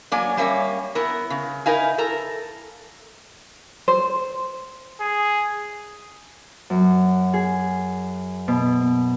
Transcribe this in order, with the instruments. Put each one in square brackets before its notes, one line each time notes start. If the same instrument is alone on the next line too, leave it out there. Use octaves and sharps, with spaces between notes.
[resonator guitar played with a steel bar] F#3 A#3 D5 G#5
G3 A#3 C#4 E5
B3 E4 A#4
C#3
D#4 E4 A#4 B4 F5 G#5
A4 A#4 A#5
[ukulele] C5
[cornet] G#4
[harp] F#2
G#4
B2